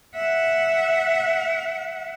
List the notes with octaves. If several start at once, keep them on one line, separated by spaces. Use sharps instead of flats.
E5 F#5